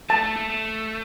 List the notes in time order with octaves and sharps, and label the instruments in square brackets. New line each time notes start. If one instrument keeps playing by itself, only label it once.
[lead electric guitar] A3 [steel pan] A5
[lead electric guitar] A3
A3
A3